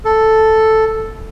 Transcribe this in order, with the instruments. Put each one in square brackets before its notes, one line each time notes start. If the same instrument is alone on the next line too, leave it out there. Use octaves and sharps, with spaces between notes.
[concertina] A4